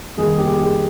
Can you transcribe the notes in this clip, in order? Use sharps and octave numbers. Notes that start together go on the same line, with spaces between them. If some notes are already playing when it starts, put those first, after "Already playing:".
F1 D#2 D#3 G3 G#4
G4
G#4